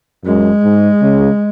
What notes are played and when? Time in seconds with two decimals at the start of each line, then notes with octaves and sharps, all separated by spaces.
0.25 F#2 G#3
0.64 G#2
1.02 C#3